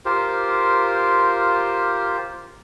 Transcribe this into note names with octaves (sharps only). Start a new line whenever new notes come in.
F4 G4 A#4 C5